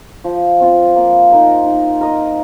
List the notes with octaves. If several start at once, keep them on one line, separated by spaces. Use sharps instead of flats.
F3
C4 F4
A#3
D#4 A#4 D#5
D#4
A#4 D#5